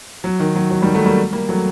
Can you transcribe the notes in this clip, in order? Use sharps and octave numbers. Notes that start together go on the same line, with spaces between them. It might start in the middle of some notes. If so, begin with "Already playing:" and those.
F#3
D#3
F#3
F#3
D#3 G3
F#3 A3
G3 A#3
G3 A#3
F#3 A3